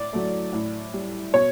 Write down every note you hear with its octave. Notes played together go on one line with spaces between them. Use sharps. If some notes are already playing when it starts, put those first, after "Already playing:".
Already playing: A2 D5
F#3 A3
A2
G3
B2 C#5